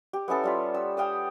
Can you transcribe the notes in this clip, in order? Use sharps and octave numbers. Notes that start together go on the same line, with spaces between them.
G4
B3 C#4 E4 A4
G3 F4 B5
E6
F5 G5 D#6 E6